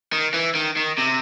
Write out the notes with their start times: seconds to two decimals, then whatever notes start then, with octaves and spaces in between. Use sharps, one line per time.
0.12 D#3
0.34 E3
0.55 D#3
0.76 D#3
0.98 C3